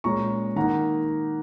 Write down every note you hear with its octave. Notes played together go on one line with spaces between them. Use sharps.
A#2 G#3 C#4 A#5 C#6
D#3 A#3 D#4 F#5 A#5